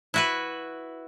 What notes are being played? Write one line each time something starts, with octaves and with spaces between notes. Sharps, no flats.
E4 F#4 B4